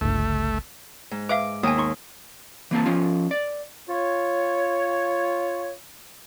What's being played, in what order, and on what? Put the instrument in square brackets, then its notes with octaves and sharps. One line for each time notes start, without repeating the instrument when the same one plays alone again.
[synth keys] G1 C#2 [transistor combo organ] A3
[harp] G#2
[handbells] B4 E5 F5 [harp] D6
[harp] D#2 D#6 [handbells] B3 G5 G#5
[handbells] D#4 C6 C#6
[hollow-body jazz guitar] E3 A#3 C4 A5
F3 C#4 F4
D5
[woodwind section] F4 C#5